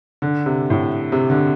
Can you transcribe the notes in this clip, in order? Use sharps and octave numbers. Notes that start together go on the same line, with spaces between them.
D3
C3
A2
C3
D3